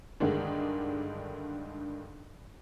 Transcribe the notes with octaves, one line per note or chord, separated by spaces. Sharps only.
G2 D3 D#3 G#3 D4